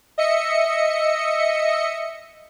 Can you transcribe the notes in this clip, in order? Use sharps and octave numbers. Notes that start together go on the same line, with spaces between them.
D#5 E5 C#7